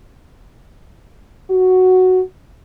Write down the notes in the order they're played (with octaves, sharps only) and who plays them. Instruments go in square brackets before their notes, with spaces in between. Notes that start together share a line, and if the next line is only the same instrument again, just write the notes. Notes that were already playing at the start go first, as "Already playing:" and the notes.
[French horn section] F#4